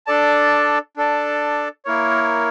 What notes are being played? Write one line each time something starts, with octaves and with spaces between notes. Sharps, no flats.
D4 A4 D5 A5
D4 A4 D5 A5
A#3 E4 A#4 C#5